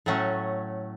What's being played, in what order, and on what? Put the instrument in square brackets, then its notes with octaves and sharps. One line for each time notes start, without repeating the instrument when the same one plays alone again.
[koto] A2 F#3 A3 C#4